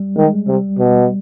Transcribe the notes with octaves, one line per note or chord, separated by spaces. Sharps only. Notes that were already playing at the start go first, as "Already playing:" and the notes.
Already playing: G3
D#3 G#3
C3 G3
B2